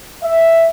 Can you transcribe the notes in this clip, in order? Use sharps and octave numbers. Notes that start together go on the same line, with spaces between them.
E5